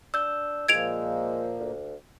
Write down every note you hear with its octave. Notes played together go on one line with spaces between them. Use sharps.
D4 E6 G6
A#2 F3 G#3 A#3 G#6 D7 F7
D2